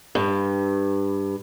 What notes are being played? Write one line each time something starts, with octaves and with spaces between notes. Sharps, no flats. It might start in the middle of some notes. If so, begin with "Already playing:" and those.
G2